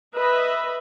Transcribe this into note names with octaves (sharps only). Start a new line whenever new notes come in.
B4 D#5 E5 B5